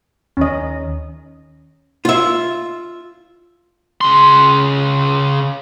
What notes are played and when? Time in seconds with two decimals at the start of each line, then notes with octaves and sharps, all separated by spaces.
0.37 D#2 D#3 C#4 D#5
2.05 F4 E5
4.01 C#3 C6